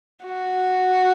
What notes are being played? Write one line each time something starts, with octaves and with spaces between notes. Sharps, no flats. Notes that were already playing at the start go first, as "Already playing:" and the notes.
F#4